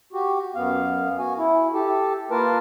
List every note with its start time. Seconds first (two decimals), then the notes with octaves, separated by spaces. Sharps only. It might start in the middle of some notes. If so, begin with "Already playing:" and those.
0.13 F#4 G4
0.55 F#2 B3 F5
1.19 F#4 G#5
1.38 E4
1.73 G4 A4
2.31 A#3 F4 A#4 B4 A5